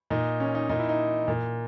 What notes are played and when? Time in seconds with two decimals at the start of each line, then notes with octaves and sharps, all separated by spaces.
0.10 A#2 D#4
0.40 C#4
0.55 D#4
0.69 A#2 D#4
0.79 E4
0.89 D#4
1.28 A#2